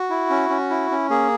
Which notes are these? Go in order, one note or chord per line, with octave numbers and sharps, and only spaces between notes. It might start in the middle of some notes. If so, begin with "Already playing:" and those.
Already playing: F#4
E4
C#4
C#4
E4
C#4
A#3 G#4